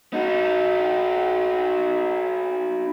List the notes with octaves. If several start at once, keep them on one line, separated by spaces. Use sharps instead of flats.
D#4 F#4